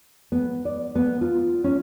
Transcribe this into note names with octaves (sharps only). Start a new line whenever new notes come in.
B3
D5
B3
F4
C#4